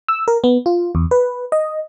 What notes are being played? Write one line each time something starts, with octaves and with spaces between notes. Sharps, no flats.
E6
A#4
B3
F4
E2
B4
D#5